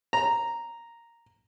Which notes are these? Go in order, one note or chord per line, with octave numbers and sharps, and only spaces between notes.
A#5